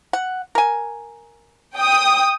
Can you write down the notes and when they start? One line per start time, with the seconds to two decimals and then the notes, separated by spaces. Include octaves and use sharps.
0.13 F#5
0.55 A#4 G#5
1.78 G5 D#6